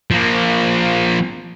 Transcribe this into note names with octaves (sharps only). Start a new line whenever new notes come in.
F3 A#3